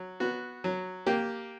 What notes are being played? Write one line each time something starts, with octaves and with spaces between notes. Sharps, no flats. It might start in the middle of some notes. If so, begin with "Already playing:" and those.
Already playing: F#3
B3 F#4
F#3
A#3 G4